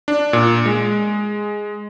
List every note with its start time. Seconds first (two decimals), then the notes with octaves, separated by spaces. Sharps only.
0.08 D4
0.33 A#2
0.66 G#3